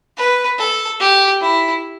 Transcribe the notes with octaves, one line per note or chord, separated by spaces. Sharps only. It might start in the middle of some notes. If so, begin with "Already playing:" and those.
B4
A4
G4
E4